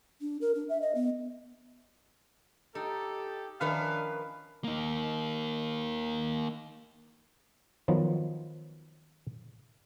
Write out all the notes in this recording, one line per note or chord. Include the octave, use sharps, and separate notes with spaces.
D4
A#4
D4
E5
D#5
B3
D#4 G4 A4
D#3 F3 C#4 D4 B4 E5 F5
A#3 D#4
D#3 F3 F#3 B3